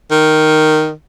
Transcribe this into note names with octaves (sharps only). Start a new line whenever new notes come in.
D#3